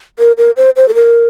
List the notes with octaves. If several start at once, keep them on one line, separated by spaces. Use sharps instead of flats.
A#4
A#4
C5
C5
A4
A#4